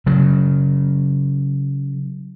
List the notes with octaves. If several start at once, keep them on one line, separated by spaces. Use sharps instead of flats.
C#3 F#3